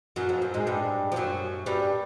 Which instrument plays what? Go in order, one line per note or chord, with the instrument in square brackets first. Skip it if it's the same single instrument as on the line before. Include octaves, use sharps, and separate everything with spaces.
[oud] F#2 F#3
F2 F3
F#2 F#3
G#2 G#3
G2 G3
F3
F#2 F#3
G2 G3